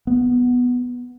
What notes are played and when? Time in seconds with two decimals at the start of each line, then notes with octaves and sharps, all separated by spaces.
0.07 B3